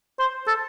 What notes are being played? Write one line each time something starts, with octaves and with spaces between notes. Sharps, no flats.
C5
A4